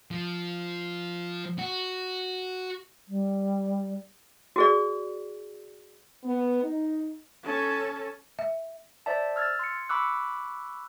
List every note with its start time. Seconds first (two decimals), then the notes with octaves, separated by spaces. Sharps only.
0.11 F3
1.59 F#4
3.08 G3
4.56 F#4 G#4 D5
6.24 B3
6.63 D#4
7.44 C#4 A4
8.39 E5
9.06 C5 D5 E5 A5
9.36 E6 F6 G#6 A6
9.59 C6 C#7
9.89 B5 C#6 D6 E6 F#6